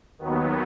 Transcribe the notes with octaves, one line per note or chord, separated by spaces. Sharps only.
D#2 D#3 F#3 B3